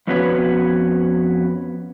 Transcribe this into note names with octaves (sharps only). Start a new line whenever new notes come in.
F2 B3 C#4 F#4 B4 C#5